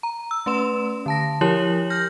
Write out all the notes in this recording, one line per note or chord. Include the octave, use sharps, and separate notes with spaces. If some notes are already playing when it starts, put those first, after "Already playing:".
A#5
E6
A3 C#4 B4 C6 E7
D3 A5 A#6
F3 E4 G4 A#4 C#5 F#7
F6 G6 A#6